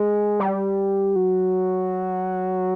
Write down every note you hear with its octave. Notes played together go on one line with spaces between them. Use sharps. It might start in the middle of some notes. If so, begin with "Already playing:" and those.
Already playing: G#3
G3
F#3